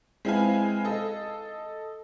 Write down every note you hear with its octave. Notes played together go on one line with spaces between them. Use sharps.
G#3 C4 E4 B4 F5 G#5
A4 D#5